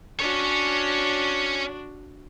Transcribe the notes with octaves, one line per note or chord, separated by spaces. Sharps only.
C#4 D4 F#4 C#5